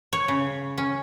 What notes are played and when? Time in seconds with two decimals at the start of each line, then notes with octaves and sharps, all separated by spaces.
0.13 C#5
0.28 C#3
0.78 C#4